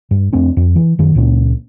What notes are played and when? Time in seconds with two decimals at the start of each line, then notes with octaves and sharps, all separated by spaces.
0.11 G2
0.33 F2 A3 C4 D4
0.57 F2
0.76 E3
0.99 F#2 D#3
1.15 C#2 A#2 C#4